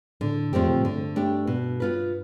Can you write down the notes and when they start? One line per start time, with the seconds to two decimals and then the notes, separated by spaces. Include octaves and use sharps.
0.21 A2 D3
0.53 F2 F3 A3 C4 G4
0.68 B2
0.76 A2
0.84 G2 D3
1.16 A3 D4 G4
1.47 B2
1.80 B3 F4 B4